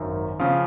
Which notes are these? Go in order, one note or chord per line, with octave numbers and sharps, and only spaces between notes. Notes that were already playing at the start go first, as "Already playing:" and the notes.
Already playing: G#1 F#2 D#3
C#3 F3 F5